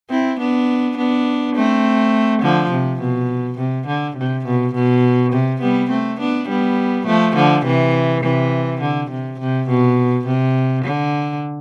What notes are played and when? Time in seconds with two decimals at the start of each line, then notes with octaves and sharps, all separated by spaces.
0.10 C4 E4
0.39 B3 D4
0.97 B3 D4
1.56 A3 C4
2.42 D3 F3
2.71 C3
3.00 B2
3.58 C3
3.87 D3
4.17 C3
4.46 B2
4.74 B2
5.32 C3
5.62 G3 B3
5.90 A3 C4
6.20 B3 D4
6.49 G3 B3
7.06 F3 A3
7.36 D3 F3
7.65 C3 E3
8.23 C3 E3
8.81 D3
9.10 C3
9.40 C3
9.69 B2
10.26 C3
10.85 D3